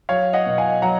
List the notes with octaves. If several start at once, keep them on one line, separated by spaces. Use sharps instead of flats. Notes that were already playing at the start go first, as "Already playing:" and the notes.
F#3 C#5 F5
D#5 F#5
B2
F5 G#5
F#3 F#5 A#5